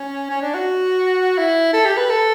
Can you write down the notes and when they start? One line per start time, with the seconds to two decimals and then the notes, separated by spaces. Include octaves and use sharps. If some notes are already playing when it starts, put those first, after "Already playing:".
Already playing: C#4
0.30 C#4
0.42 D4
0.55 F#4
1.38 E4
1.74 A4
1.86 G4
1.97 B4
2.10 A4